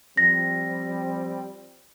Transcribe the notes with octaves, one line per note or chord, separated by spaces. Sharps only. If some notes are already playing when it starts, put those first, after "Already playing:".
F3 G3 C4 A#6